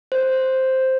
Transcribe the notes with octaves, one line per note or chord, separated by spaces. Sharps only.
C5